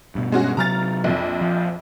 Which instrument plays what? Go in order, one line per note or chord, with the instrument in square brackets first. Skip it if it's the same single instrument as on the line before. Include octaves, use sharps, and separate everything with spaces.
[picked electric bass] G2 B2
[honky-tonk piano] G#3 C#4 F#4
[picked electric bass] C3 F#3 [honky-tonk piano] A#5 F6 A6
[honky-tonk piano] A#1 F2
[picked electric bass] F3